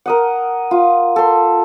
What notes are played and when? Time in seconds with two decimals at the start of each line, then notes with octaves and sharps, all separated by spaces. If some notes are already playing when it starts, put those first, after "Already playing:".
0.06 A#4 D#5 F#5
0.71 F4
1.16 A4 C6